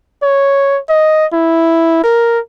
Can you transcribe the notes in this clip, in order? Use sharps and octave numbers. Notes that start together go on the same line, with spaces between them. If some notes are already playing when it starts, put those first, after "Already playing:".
C#5
D#5
E4
A#4